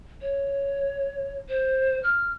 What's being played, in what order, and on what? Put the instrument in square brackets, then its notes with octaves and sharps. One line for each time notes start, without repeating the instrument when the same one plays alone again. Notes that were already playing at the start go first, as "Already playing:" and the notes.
[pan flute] C#5
C5
F6